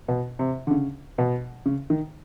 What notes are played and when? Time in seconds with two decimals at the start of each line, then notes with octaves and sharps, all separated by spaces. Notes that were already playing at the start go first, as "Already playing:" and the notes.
0.08 B2
0.39 C3
0.67 D3
0.71 C#3
1.18 B2
1.66 C#3
1.90 D#3